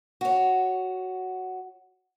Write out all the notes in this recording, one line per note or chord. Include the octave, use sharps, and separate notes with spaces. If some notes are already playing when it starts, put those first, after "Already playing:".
F#4 C#5